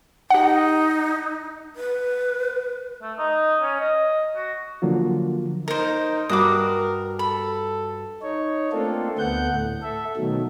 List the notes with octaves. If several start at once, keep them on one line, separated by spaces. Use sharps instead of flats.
D#4 G4 F#5
B4
A3
D#4
C#4
D#5
F#4
D3 F3 F#3 A#3 F4
D#4 A#4 C5
G2 F#4 A#4 D6 D#6
A4 B5
D#4 C#5
A3 A#3 C4 D4 F4 A4
D2 A3 B3 F#5 G6
A2
A4 E5
B2 D#3 F#3 A3